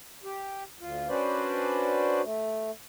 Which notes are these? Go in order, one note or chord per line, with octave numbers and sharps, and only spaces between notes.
G4
D2 F4
C#4 D4 F#4 B4 C5 D5
A3